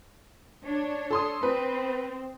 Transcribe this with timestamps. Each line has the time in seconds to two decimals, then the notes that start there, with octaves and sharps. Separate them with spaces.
0.66 D4 C#5
1.11 A4 C6 D#6
1.43 C4 B4